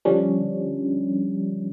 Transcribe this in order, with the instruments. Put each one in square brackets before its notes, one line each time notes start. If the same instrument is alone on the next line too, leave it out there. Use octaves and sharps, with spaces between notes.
[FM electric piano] D3 F3 G3 C#4 D4